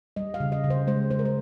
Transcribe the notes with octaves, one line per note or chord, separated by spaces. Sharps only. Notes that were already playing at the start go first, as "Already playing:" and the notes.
G3 D#5
F5
C#3
D#5
C#3
C5
G#3 C5
G#3 C5
A#4
C5